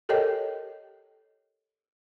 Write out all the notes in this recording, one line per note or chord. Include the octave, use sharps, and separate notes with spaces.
G4 A4 A#4 C#5 D#5 G5